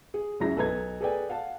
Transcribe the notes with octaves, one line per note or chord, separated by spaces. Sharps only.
G#4
C#2 F#2 G#3 E4 A#5 A#6
B1 A4 B4 D#5 A#5 G#6
G#4 A4 B4 D5 G5 G#5
F5 F#5 A5